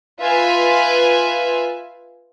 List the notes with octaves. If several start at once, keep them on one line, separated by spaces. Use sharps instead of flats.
F4 B4 E5 G#5